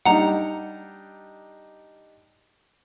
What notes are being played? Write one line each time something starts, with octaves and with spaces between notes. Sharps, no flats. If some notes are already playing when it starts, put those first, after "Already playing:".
G3 D4 D#4 F#5 A#5